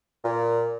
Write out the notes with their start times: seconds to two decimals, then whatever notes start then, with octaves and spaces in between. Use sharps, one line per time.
0.24 A#2